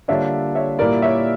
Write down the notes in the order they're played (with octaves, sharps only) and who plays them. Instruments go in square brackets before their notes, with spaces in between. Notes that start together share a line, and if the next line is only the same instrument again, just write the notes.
[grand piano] D3 G3 A#3 D4 F4 [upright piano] C#5 E5
[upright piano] C#5 E5
[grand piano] A#2 G3 A#3 E4 [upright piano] A#4 D5
[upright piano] C#5 E5